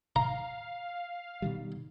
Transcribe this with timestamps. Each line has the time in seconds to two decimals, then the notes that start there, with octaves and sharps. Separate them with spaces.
0.16 F5 A#5
1.42 B2 D#3 G3